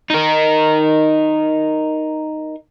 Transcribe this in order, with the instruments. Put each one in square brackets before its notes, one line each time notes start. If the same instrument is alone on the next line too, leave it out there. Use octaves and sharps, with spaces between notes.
[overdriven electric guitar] D#4 A#4